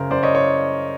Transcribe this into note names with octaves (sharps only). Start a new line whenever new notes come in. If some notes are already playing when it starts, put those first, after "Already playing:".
Already playing: F#2 C#3 A#4 C5
F#2 C5 D5
C#5 D#5
C#5